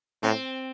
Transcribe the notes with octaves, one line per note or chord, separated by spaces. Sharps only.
A2 C4